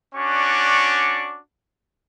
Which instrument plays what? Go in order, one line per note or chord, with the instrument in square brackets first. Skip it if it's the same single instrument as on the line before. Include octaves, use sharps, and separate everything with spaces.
[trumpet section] C#4 D4 F#4 D5 C#6